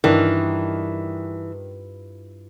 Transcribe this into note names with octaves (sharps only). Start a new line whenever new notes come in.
G2 D#3 E3 D4 E4 F4